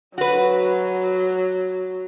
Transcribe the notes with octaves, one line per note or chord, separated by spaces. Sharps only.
F#3 F#4 B4